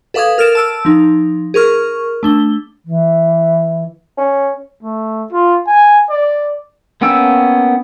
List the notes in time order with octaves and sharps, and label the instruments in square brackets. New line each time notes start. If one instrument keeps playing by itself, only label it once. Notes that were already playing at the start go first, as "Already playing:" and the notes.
[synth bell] A4 B4 F5 D6 D#6 G#6
A#4 F6 A6 D7 E7
A5 E6 D7
F3 D#4
G#4 A#4 C#6 F6
A3 D4 G7
[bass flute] E3
[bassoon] C#4
[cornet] A3
F4
G#5
D5
[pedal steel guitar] A#3 B3 C#4 G5 E6